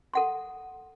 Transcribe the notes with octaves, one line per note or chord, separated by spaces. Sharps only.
A4 F#5 C6